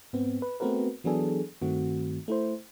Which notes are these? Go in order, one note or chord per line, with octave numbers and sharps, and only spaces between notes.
G#2 B3 C4
B4
A3 B3 C4 F#4 A#4 B4
E3 F#3 B3 D4 G#4 A4
G2 D#3 A3 C4 F#4
A3 E4 C5